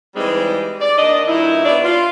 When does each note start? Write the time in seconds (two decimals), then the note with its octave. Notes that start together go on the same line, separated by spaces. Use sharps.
0.16 E3 G3 G#3 C4 D#4
0.81 D5
0.98 D#2 D4 D#5
1.28 G2 A#2 D#4 E4
1.65 B3 D4 C#5 D5
1.84 F4